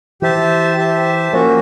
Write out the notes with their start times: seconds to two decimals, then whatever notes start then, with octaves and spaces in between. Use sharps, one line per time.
0.22 E3 G4 C5 E5 A5
0.77 G4 C5 E5 A5
1.33 F3 A#3 C#4 F#4